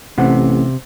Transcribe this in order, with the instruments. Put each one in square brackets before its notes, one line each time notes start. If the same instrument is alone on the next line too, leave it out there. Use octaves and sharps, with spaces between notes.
[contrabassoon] A1 [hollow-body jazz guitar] C3 F#5